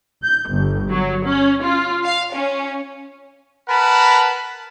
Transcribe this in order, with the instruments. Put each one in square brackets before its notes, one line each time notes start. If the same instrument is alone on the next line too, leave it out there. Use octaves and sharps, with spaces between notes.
[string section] G6
G1
F#3
C#4
F4
F5
C#4
[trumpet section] A#4 B4 F#5 A5 B5